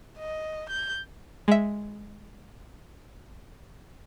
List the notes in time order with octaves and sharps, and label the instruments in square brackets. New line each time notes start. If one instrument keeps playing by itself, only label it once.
[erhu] D#5
G6
[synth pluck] G#3 E5